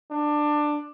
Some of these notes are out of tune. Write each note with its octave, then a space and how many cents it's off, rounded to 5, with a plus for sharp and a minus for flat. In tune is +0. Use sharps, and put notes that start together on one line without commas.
D4 +15